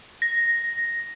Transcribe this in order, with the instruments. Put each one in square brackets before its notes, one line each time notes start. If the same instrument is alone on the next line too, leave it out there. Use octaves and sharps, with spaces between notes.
[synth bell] A#6